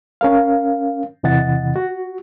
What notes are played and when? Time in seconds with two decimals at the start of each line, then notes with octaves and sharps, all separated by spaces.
0.21 C#4 A#4 F5
1.23 E2 C3 E3 D#5 F#5 A6
1.76 F#4